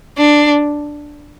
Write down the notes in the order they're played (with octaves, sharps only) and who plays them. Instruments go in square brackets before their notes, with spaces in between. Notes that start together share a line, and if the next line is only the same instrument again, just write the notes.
[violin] D4